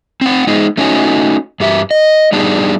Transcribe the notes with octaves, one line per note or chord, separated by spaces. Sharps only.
C4 F#5
G#3 B3 D#4 G#4
A3 C#4 D#4 F#4 C#5 G#5
G2 G4 E5
D#5
G3 B3 D4 D#4 G4 G#4